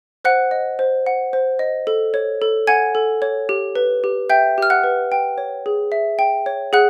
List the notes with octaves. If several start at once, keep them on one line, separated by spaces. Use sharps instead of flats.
C5 F#5 F#6
D#5
C5
F#5
C5
D#5
A4
C#5
A4
F#5 G#5 G#6
A4
C#5
G4
B4
G4
E5 G5 G6
G4 F6
F#5 F#6
B4
G5
C#5
G#4
E5
G5
C#5
G#4 F#5 F#6